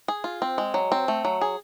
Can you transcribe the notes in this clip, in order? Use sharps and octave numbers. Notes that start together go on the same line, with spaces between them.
G#4
F4
C4
G#3
F#3
C4
A3
F#3
G#4